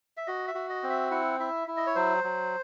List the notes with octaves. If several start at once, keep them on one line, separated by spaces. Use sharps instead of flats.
E5
F#4 D#5
E5
F#4
D#5
C4
E5
E4 F#5
E4 E5
E4
D#5
C#5
F#3 C5
F#3